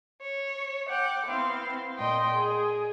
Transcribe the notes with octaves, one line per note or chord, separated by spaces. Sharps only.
C#5
F#5 G5 D6
B3 C4 E4 C5 F5
A#2 D#5 G5 C6
G#4